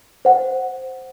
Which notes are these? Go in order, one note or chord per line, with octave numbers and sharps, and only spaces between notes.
C5 F#5